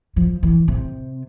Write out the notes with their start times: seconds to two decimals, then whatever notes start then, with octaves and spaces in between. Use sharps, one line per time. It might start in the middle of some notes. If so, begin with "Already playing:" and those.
0.16 F3
0.43 E3
0.68 C3